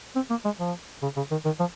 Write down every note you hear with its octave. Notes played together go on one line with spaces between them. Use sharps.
C4
A#3
G#3
F3
C#3
C#3
D#3
D#3
F3